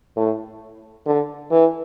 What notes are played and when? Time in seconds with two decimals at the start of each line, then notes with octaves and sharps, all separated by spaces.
0.17 A2
1.06 D3
1.51 E3